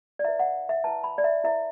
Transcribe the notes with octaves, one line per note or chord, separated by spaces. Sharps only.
D5
E4 B4 E5
F#5
E5
E4 B4 A5
B5
D5
E5
E4 B4 E5